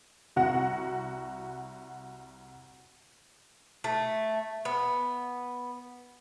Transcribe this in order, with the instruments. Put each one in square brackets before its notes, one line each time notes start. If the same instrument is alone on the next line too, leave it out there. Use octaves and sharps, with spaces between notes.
[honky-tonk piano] C2 F#4 F#5 A#6
[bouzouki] A3
B3